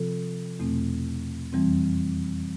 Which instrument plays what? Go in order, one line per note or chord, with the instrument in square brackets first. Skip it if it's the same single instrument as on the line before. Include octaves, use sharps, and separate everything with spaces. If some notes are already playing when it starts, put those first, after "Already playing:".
Already playing: [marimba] C3 F3 C4 F4 A4
E2 B2 A3 C4
F2 E3 G3 C4